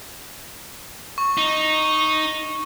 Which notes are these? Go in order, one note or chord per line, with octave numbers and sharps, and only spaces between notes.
C#6
D#4